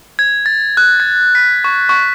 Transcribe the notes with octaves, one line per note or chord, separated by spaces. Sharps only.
G#6
A6
F#6
G#6
B6
C#6
C#6